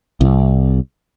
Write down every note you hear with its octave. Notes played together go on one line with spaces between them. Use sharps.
C2